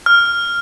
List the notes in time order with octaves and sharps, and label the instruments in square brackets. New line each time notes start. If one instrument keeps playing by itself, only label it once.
[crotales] F6